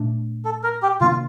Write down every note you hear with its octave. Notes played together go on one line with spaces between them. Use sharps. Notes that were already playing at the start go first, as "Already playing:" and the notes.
Already playing: A#2 A3 D4
A4
A#4
G4
C3 D#3 A#3 D4 F4